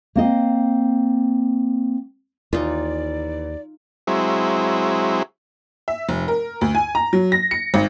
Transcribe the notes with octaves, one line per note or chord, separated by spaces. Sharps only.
A#3 C4 D#5
D#2 E3 D#4 F4 D5
F#3 G#3 C4 E4
E5
F1
A#4
D2
G#5
A#5
F#3
A#6
C#7
G#1